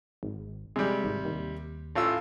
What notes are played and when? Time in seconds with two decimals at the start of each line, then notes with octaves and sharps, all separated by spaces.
0.23 G#1
0.76 C3 G3 G#3
1.04 G#1
1.25 D#2
1.95 A1 F4 E6